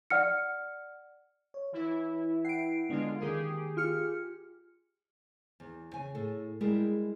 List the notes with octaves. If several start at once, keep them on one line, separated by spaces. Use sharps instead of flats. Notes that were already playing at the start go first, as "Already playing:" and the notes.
D5 F#5 F6 C#7
C#5
E3 E4
F#5 G5 C7 D7
D3 G#3 B3 D4 F4
D#3 A#3 G4 G#4 A#4
F4 F6 C#7
E2
C#3 G#5
A2 G#4 A4
G3 G#3 E4 G4 G#4 A#4